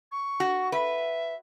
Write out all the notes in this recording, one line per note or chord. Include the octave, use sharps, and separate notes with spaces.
C#6
F#4
B4 E5